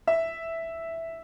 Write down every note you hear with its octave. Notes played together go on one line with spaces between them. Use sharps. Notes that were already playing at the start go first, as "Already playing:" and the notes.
E5